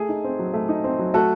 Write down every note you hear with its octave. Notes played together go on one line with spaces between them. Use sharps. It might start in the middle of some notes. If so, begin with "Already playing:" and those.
Already playing: A3 G#4
D#4
C4
F#3
A3
D#4
C4
F#3
A3 F#4 A4